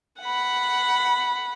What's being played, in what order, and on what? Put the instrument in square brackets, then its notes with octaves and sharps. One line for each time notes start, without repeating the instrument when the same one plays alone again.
[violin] F#5 B5